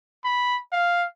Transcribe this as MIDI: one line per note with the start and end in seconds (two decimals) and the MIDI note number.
0.24 0.57 83
0.72 1.05 77